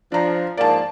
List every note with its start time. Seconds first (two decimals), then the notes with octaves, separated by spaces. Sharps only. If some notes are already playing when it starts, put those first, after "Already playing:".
0.12 F3 D4 A#5
0.57 G#2 F3 A#3 D5 A5